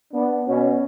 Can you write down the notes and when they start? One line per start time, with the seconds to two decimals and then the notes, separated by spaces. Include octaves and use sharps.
0.13 B3 D4
0.47 B2 C#4